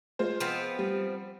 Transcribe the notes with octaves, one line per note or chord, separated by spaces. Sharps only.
G#3 F4 C5
F3 B3 C4
G3